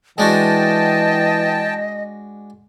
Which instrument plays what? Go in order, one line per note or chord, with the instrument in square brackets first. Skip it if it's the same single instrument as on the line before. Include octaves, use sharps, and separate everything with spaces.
[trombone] E3 [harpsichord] G#3 D4 F#4 [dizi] D#5 [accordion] G5 A5